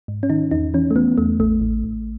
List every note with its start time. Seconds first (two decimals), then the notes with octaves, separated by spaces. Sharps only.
0.08 G#2
0.23 C#4
0.30 D#3 D#4
0.51 E2 D#4
0.74 E3 C#4
0.91 A3
0.96 E3 B3
1.18 E2 A3
1.39 A1 A3
1.61 A1
1.84 A1